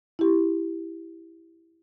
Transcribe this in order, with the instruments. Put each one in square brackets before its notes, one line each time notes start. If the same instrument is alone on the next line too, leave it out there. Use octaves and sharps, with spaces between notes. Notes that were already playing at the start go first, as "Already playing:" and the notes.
[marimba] E4 G4